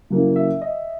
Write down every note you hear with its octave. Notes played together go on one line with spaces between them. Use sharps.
C#3 F#3 A#3 C#4 E4
E5
D#5